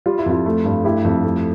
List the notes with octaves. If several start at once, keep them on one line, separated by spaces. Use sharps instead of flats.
G3 F4
E4
F2 F4
A3
G2
A3 E4 G4
F2
A3